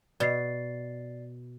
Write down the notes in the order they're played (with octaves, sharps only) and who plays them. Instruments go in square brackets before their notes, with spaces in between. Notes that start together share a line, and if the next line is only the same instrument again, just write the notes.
[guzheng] B2 [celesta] D5 A6 C7